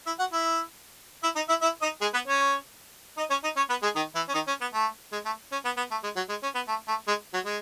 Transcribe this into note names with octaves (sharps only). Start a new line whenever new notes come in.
E4 E5
F#4 F#5
E4 E5
E4 E5
D#4 D#5
E4 E5
E4 E5
D#4 D#5
G#3 G#4
B3 B4
C#4 C#5
D#4 D#5
C#4 C#5
D#4 D#5
C#4 C#5
B3 B4
G#3 G#4
D#3 D#4
E3 E4
C#4
D#3 D#4
C#4
B3
A3
G#3
A3
C#4
B3
B3
A3
G#3
F#3
G#3
C#4
B3
A3
A3
G#3
F#3
G#3